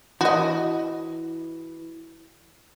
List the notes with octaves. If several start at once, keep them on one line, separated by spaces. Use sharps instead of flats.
E3 F#4 D#5